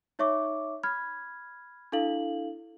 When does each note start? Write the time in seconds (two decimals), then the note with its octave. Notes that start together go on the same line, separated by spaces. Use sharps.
0.19 D#4 C#5 E5 C#6 D6
0.83 B5 F6 G#6
1.92 D4 E4 A4 F5 F#7